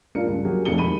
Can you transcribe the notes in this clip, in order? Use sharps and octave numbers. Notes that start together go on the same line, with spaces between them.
G2 D4 F4 A#4 C#7
C#2 G2
F#3 A#3 G4 G#4 A#4
F1 F2 C3 G#4 C#7 G7
E1 D#3 G4 B5 D#7 G7